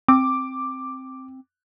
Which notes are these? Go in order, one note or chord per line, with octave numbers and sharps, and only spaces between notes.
C4 D6